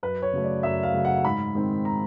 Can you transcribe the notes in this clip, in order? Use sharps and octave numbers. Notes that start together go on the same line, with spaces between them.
F#2 B4
C#5
C#3 F#3 A3
D5
F#2 E5
F5
C#3 F#3 A3
F#5
G#2 B5
D#3 G#3 C4
A#5